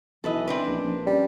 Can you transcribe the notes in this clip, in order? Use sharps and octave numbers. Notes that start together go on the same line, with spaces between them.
B1 E3 A4 B4 D#5
C4 D4 B4
A#1 C#4
A#1
G3 C#4